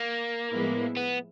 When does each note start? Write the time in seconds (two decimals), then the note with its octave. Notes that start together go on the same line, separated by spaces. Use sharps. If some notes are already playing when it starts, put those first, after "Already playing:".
Already playing: A#3
0.51 A2 F3 G#3 B3 E4
0.97 B3